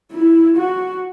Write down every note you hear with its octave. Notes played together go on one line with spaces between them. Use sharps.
E4
F#4